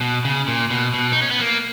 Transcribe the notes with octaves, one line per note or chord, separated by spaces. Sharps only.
B2
C#3
A#2
B2
B2
D#4
C#4
B3
A#3